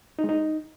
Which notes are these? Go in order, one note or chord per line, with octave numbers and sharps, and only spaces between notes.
D#4
G#3
D#4